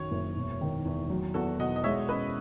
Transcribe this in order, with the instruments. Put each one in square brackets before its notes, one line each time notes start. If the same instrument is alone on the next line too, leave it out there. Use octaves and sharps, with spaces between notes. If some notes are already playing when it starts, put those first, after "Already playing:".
Already playing: [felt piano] F#2 D#3 [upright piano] C#5
[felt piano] F#1
E1
D#3
E2
F#3
[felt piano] E2 [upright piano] F#4 A4
[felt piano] B2 [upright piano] D#5 F#5
[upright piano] D#5
[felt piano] G#3 [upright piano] C#5 E5
[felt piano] C#4 [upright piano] B4 D#5